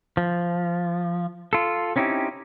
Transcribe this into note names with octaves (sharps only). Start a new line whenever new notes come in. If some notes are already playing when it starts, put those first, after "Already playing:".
F3
F4 A4
C4 C#4 D#4 E4 G4